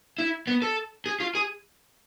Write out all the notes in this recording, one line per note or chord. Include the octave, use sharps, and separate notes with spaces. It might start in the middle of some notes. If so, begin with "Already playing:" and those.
E4
B3
A4
G#4
F4
G#4